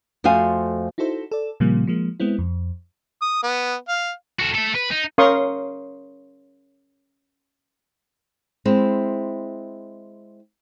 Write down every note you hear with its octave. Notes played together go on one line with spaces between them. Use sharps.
F2 A3 F#4 C5 F5 G#5
D#4 E4 F#4 A4 C5
A4 D5
A#2 C#3 F3 G3 A#3 C4
F3 G#3 A#3
G#3 B3 C4 E4
F2
D#6
B3
F5
F#4 A4
A3 A4
B4
D#4
C#4 A#4 F5 C6 C#6 D#6
G#3 C4 E4